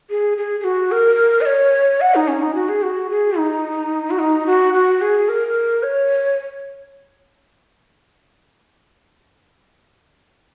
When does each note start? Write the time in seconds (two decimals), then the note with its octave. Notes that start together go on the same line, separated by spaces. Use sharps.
0.10 G#4
0.38 G#4
0.60 G#4
0.64 F#4
0.92 A#4
1.41 D#5
1.46 C#5
2.01 F#5
2.15 D#4
2.28 C#4
2.42 D#4
2.55 F#4
2.69 G#4
2.83 F#4
3.10 G#4
3.38 D#4
4.11 F#4
4.19 D#4
4.46 F#4
4.74 F#4
5.01 G#4
5.29 A#4
5.83 C#5